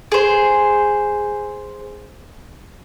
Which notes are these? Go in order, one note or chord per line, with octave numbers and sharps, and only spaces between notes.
G#4 C5